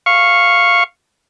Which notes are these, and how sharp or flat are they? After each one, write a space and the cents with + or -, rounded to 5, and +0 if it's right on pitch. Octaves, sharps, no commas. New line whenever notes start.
F5 +0 C#6 -10